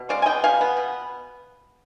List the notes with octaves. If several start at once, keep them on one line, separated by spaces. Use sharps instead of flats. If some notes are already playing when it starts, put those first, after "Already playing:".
Already playing: B2
G#3 D5 F5
G#5
B3 D#5 G5
B2 F5 G#5
B3
B2